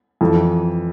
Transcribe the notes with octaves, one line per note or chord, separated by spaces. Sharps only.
F2 E3